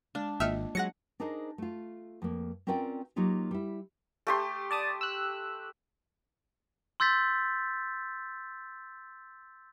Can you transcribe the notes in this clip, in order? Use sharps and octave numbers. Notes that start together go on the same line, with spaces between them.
G#3 D4
G#1 A#3 F4 D#5 E5 F6
F#3 G#3 F#5 A#6 C#7
D4 D#4 G#4 A#4 C5 D#5
A3 F4
F2 A#3
C4 C#4 F4 A#4 D5 G5
F#3 A#3 D#4 F4 G4
G3 E4
A3 G4 C6
D5 A5 D#6
E6 F#6
C6 E6 G6 A6 B6